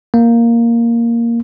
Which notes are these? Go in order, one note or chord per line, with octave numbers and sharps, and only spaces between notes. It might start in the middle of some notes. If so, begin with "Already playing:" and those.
A#3